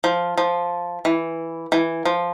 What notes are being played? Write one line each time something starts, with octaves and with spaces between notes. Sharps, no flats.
F3
F3
E3
E3
F3